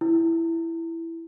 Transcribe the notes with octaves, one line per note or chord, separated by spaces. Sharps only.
E4